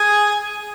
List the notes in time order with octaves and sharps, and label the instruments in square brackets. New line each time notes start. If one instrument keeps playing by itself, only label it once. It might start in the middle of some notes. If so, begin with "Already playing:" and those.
Already playing: [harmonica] G#4 G#5